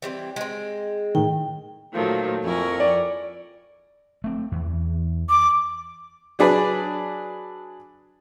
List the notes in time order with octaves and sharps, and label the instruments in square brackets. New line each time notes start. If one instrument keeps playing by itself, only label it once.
[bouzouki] E3 G3 C4
G#3 C4
[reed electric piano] A2 D#3 [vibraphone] G5
[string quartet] A#2 D#3 F3 [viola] F#3 A3
[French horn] F2 [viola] E4 A#4 [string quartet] G#5 C#6
[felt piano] D5
[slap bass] A3 C4
E2 E3
[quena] D6
[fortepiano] F#3 D4 G#4 B4